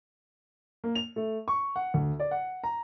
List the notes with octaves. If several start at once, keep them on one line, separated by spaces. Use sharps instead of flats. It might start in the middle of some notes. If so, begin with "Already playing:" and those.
A#3
F7
A3
C#6
F#5
D2
D5
F#5
A#5